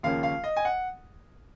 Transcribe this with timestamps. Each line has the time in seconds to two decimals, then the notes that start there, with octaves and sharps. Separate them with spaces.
0.03 D#2 C#3 F3 A#3 C#4 F5
0.23 F5
0.44 D#5
0.57 G#5
0.65 F#5